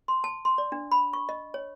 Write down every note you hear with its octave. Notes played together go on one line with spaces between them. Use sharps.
C6
A5
C6
D5
D4
B5
C#6
D#5
C#5